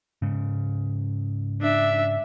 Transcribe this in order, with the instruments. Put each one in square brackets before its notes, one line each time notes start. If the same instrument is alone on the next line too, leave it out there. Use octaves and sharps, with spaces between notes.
[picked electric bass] G#2 C#3
[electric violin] D4 E5